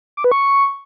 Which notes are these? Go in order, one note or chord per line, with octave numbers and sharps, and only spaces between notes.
D6
B4
C#6